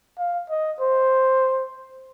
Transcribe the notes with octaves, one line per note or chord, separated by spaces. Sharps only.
F5
D#5
C5